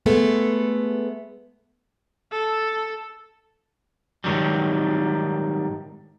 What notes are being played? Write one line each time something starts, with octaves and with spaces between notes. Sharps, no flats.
G#3 A3 B3 A4
A4
G#2 D#3 F#3 G3